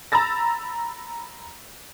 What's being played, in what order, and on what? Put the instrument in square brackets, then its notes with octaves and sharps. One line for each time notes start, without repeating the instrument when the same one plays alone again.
[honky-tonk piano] A#5 B5 E6 A6 A#6